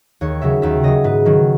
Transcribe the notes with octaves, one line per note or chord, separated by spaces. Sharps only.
D#2 C#5
C#3 F#3 E5
D#2 E5
C#3 F#3 D#5
G#2 B4
D#3 F#3